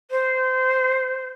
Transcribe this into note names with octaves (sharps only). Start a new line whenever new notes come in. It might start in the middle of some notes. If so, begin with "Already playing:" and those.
C5